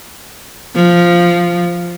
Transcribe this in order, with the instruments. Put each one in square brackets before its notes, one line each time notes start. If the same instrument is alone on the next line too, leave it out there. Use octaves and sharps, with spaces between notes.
[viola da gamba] F3